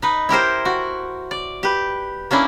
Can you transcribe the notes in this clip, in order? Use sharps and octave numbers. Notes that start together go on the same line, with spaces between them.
D#4 B4
E4 G4 A#4 C5
F#4
D5
G4 B4
A#3 C#4 D4 E4